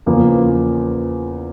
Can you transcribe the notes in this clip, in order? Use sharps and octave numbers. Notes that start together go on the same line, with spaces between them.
E2 C#3 F3 A#3